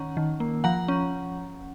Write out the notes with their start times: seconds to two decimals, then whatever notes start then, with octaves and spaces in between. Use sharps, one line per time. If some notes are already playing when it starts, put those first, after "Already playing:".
Already playing: D#3 C#4 F#5 A#5
0.17 D#3
0.40 A#3
0.64 F3 F#5 A#5
0.88 C#4